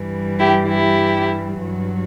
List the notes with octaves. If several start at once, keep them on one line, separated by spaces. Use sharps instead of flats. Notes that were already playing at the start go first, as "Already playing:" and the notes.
Already playing: G2 E3 G3
E4 G4
E4 G4
G2 F#3